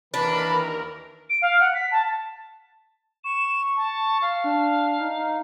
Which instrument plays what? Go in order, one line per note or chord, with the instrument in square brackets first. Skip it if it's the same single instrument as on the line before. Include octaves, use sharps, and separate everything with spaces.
[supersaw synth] D#2 A#4 [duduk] E3 [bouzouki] D4 [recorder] B5
[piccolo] D7
F5
F#5
B6
A5
[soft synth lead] C#6 [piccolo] E7
[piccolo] A5
F5
[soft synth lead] D4
D#4